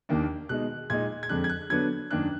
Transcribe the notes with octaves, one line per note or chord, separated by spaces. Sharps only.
D#2 D#3 A#3 D4
B2 G#3 D#4 F#6
A#2 G#3 D#4 G#6
G#6
F2 D3 G#3 D4 F#6
G#6
F#6
D3 F#3 B3 D4 G#6
F#2 D#3 A#3 D4 F#6